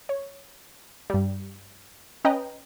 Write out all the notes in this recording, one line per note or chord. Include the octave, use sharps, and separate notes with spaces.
C#5
G2 G3
C#4 B4 D#5 G5 A#5